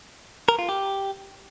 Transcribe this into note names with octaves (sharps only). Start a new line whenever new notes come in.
A#4
F4
G4